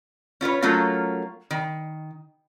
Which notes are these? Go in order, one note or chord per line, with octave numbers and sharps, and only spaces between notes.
C#4 F4 B4 C#5
F#3 A3 A#3 C#4 F4
D#3